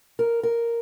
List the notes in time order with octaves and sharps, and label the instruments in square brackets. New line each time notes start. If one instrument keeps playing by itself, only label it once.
[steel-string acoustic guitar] A#4
A#4